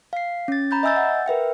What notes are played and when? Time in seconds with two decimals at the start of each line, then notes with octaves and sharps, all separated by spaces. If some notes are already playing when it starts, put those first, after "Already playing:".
0.13 F5 C7
0.48 C#4 A6
0.71 A#5 B5 G6 A6
0.83 D#5 E5 G#5 E6 G6 A6
0.97 F#5
1.26 A#4 B4 E5 G5